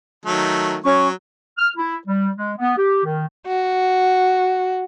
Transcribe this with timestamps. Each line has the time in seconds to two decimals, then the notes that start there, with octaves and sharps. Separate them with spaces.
0.26 D#3 F#3 A3
0.84 F#3 C#4 C#6
1.58 F6
1.77 E4
2.07 G3
2.36 G#3
2.57 B3
2.77 G4
3.05 D#3
3.47 F#4